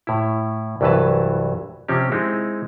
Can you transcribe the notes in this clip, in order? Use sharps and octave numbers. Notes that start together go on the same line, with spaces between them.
A2 E4
C2 G2 E3 F#3 B4 A5
C3 F3 C4 C#4 G4
G#3 C4 D#4 E4